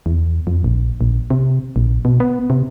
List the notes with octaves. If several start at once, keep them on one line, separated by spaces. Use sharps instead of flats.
E2
F2
A#1
A#1
C3
A#1
B2
B3
C3